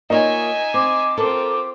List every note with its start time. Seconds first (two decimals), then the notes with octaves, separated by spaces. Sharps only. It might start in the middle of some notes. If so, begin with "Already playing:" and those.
0.10 A#3 D#4 F4 C#5 E5 G#5
0.74 C4 D6
1.17 C4 F4 A4 A#4